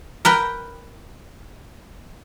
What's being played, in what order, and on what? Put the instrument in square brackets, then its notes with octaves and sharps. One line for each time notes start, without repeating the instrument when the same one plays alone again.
[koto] A#4 B4 G5